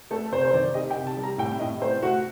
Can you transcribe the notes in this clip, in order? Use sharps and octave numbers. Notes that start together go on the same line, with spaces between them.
A3 A4
C3 C5
C5
D#3 D5
G4 D#5
G5
C3
A5
G3
A#5
A2 G5
A2 D#5
A3 C5
A3 F#4